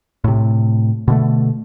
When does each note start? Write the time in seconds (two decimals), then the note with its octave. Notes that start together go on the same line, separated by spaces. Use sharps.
0.24 A2 C3
1.08 B2 D3 A3